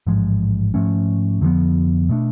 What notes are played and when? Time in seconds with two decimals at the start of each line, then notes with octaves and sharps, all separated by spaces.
0.07 A1 G#2 F3 G#3
0.74 G#2 F3 A3 C#4
1.41 F2 D3 F3 B3
2.09 B2 A3 D4